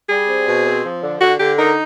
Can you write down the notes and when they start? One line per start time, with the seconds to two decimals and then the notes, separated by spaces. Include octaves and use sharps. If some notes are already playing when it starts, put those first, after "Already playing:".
0.09 G3 G#4
0.27 C4
0.46 B2
0.65 C4
0.84 F3
1.02 D3
1.20 D3 F#4
1.39 D3 G4
1.58 D#4 A#4